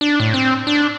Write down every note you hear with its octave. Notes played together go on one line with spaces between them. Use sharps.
D4
A2
C4
D4